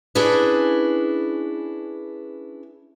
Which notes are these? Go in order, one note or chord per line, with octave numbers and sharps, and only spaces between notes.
C#4 D4 E4 G#4 B4